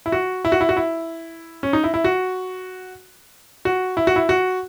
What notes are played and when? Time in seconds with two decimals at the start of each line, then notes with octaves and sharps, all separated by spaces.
0.06 E4
0.12 F#4
0.45 E4
0.52 F#4
0.61 E4
0.69 F#4
0.77 E4
1.63 C#4
1.73 D#4
1.84 E4
1.94 E4
2.04 F#4
3.65 F#4
3.97 E4
4.07 F#4
4.16 E4
4.29 F#4